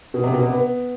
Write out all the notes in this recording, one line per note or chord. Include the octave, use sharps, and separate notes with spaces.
B2
C3
B2
C3
B3